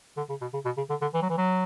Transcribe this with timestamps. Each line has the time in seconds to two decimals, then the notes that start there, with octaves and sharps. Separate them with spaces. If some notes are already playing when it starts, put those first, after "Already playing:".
0.17 D3
0.29 C#3
0.41 B2
0.54 C#3
0.65 B2
0.77 C#3
0.90 D3
1.01 D3
1.14 E3
1.22 F#3
1.30 E3
1.38 F#3